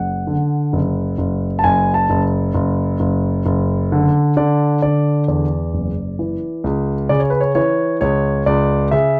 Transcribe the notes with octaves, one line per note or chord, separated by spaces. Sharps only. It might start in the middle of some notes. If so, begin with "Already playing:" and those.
Already playing: F#1 F#5
D3
F#1
F#1
A5
F#1 G#5
A5
F#1
F#1
F#1
F#1
D3
D3 D5
D3 D5
E2 D5
F#1
E3
C#2
C#3 D5
C#5
B4
C#5
E3 C#5
C#2 C#5
C#2 D5
C#3 E5